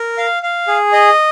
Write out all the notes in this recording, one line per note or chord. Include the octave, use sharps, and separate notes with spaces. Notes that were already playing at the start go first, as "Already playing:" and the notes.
Already playing: A#4
F5
F5
G#4
D#5